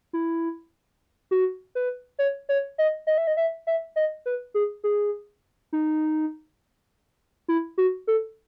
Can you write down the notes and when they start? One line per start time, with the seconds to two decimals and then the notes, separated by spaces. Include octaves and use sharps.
0.13 E4
1.31 F#4
1.75 B4
2.19 C#5
2.49 C#5
2.78 D#5
3.07 D#5
3.18 E5
3.27 D#5
3.37 E5
3.67 E5
3.96 D#5
4.26 B4
4.54 G#4
4.84 G#4
5.73 D#4
7.48 E4
7.78 F#4
8.07 A4